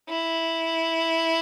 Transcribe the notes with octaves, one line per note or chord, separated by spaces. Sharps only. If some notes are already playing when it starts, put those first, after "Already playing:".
E4